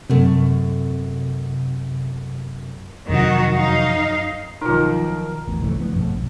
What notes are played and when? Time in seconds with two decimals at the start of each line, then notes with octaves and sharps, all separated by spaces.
0.10 F#2 C3 A3
3.09 F2 C3 D#3 F#3 D#4 F#4
3.54 F#2 D#4 F5
4.61 B1 D#3 F3 D#4 F4 A#4
5.47 A1 E2
5.60 F#1 C2 E3 A3
5.80 D2 F3 B3
5.94 G#1 F2 B2 A3
6.14 B1